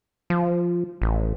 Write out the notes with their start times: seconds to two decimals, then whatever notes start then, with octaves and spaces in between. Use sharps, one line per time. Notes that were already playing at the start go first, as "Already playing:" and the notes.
0.30 F3
1.02 A1